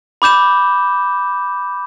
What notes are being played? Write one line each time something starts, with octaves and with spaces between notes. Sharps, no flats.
B5 D6 G6 E7